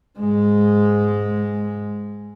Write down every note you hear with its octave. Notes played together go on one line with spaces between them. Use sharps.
G#2 G#3